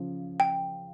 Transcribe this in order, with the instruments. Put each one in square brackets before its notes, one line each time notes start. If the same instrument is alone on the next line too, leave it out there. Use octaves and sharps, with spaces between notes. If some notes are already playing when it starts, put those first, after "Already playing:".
Already playing: [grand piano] C#3 F3
[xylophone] G5